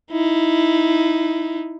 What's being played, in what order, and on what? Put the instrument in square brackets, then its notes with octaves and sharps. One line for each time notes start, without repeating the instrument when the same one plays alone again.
[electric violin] D#4 E4